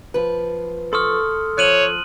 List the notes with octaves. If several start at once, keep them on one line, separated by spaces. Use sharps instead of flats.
F3 B4
A4 C6 C#6 D#6 F6
F3 C#5 F#6 D#7 F#7